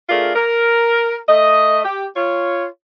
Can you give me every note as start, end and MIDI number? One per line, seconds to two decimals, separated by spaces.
0.09 0.32 57
0.09 0.32 62
0.09 0.32 65
0.09 0.32 68
0.09 0.32 70
0.35 1.17 70
1.29 1.83 57
1.29 1.83 75
1.85 2.05 67
2.16 2.66 65
2.16 2.66 73